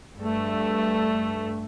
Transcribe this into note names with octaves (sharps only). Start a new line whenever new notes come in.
G2 A3